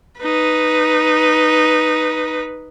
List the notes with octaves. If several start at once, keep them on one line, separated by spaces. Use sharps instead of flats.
D#4 B4